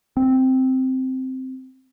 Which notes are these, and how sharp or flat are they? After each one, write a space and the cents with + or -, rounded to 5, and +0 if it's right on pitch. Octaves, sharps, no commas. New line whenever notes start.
C4 -5